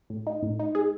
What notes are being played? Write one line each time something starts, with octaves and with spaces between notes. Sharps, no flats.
A2
D#4
A2
D#4
G#3 G#4